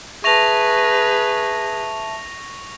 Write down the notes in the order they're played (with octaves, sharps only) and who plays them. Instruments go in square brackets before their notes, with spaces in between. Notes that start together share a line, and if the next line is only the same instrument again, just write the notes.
[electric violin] G#4 B4 [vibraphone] E5 A5 [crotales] C#6 A#6 F7